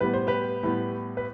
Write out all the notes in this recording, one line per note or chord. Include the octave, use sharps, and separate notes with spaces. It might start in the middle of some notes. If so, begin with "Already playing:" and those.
A2 G3 B3 B4
C5
G4 B4
A2 G3 B3
B4